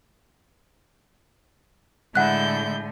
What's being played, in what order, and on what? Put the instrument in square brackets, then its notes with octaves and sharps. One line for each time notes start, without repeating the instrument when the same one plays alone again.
[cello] A2 D3 [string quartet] G#3 E4 G6 [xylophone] F#5 F#6